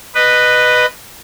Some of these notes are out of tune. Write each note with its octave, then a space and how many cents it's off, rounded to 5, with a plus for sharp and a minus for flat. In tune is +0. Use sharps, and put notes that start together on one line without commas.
B4 +0 D#5 -20